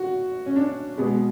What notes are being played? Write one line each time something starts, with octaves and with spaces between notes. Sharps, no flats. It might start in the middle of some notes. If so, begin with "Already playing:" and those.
Already playing: F#4
C#4
D4
B2 G#3 B3